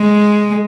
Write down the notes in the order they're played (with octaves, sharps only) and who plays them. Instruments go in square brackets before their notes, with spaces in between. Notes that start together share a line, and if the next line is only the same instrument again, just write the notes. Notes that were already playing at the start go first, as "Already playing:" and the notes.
Already playing: [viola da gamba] G#3